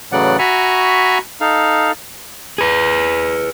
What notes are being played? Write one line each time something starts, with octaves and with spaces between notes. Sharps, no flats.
A2 C#3 E3 F#3 D5 F#5
F#4 E5 G#5 A#5 B5 C#6
D#4 A4 F5
G#4 B4